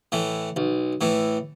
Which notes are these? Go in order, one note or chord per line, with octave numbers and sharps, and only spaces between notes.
A2 E3
B1
A2 E3